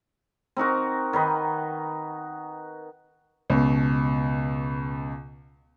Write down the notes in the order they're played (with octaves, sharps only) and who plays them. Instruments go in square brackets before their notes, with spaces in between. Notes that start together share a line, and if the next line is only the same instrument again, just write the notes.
[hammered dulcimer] C4 D#4 F#4 A#4
D#3 D#4 B4
[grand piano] C#2 B2